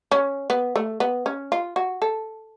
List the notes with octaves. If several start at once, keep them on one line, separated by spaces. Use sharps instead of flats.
C#4
B3
A3
B3
C#4
F4
F#4
A4